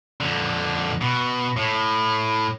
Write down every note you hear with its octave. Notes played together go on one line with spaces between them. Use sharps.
F2 D3
B2
A2